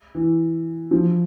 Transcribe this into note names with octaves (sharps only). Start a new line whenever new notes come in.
E3
F3